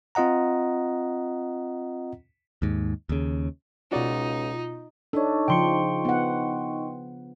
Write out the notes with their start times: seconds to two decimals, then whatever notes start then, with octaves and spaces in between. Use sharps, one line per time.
0.15 C4 F4 D#5 F#5 A#5
2.62 D#2 G#2
3.09 D#2 C#3
3.92 C#2 B2 D#4 F4 F#4 D5
5.13 D4 D#4 A4 C#5 D#5 C#6
5.48 C#3 F3 G5 C6 C#7
6.05 B3 F#5